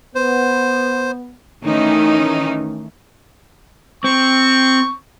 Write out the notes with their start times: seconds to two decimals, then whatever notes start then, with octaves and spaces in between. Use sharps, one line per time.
0.15 B3 C5
1.64 D#3 E3 A3 C#4 D#4
4.04 C4 C#6